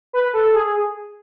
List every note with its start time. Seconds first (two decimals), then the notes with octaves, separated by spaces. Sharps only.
0.13 B4
0.34 A4
0.54 G#4